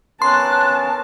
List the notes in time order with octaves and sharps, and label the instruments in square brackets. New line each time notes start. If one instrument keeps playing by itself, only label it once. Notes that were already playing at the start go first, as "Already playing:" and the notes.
[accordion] B3 C#4 A#4 [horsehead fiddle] A5 [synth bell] C6 [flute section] F#6